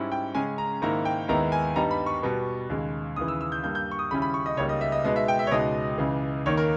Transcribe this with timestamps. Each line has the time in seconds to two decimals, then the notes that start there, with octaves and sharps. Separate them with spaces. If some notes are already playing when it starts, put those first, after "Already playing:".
Already playing: G#2 G3 C#4 E4
0.12 G5
0.35 C#3 G#3 C#4 G#5
0.58 A#5
0.82 G#2 D#3 A#3 E4 A#5
1.05 G5
1.28 D#2 D#3 G#3 B3 E4 A#5
1.52 G#5
1.76 G2 G3 B3 D#4 A#5
1.91 B5
2.06 C#6
2.23 B2 G3 B3
2.70 D#2 C#3 G#3
3.16 D#2 C#3 E3 D#6
3.28 E6
3.41 E6
3.52 G6
3.63 G2 G3 A#3 G6
3.75 G6
3.91 C#6
3.99 D#6
4.11 D#2 C#3 G3 C#4 E4 B5
4.22 B5
4.34 C#6
4.46 D#5
4.57 C#2 C#3 G3 A#3 D#4 C#5
4.69 D#5
4.81 E5
4.92 D#5
5.04 B2 G#3 B3 D#4 D#5
5.16 E5
5.28 G5
5.39 E5
5.47 C#5
5.51 C#2 B2 G#3 D#4 D#5
5.98 C#2 C#3 E3
6.46 D#2 D#3 A#3 C#5
6.57 A#4